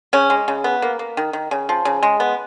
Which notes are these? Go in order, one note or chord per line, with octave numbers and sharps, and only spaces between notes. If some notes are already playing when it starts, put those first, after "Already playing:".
C#3 C#4
G#3
C#3
B3
A#3
A#3
D#3
D#3
C#3
F3
C#3
G#3
B3